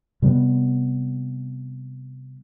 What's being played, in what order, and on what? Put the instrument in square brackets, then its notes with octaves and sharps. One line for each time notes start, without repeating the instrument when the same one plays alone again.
[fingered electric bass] C3 G3 A3 B3